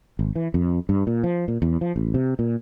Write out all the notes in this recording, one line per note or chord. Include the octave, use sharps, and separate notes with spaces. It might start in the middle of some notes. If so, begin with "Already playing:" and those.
G#1
E3
F2
G2
A#2
F3
A#2
E2
F3
A1
C3
A#2